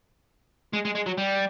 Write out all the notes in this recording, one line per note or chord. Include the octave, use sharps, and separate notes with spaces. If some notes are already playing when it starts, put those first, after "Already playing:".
G#3
G#3
G#3
F#3
G3